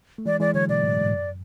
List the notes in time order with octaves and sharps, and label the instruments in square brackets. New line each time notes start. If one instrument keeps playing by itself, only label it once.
[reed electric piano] A3
[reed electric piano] E3 G#3 [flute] D5
[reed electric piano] E3 G#3 [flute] D5
[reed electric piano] D3 F#3 [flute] C#5
[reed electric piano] B2 [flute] D5
[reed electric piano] A2
G#2
F#2